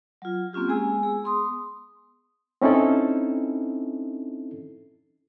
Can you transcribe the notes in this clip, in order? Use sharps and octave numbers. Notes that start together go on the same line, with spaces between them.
F#3 F4
A#3 C4 C#4 F4 G4
G#3 B3 G#4 G#5 E6
G#4
B3 C6 D#6
C4 C#4 D#4 E4 A4